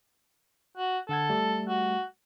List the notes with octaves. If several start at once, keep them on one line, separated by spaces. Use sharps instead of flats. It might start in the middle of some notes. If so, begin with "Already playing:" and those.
F#4
D3 A4 F#5 G#6
G3 A3
F#4